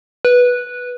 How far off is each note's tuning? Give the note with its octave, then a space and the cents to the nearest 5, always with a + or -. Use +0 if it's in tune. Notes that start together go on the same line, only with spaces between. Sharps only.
B4 -10